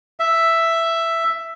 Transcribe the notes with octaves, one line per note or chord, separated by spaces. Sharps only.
E5